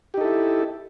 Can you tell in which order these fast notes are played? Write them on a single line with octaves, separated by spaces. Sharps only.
G4 D#4 A4 E4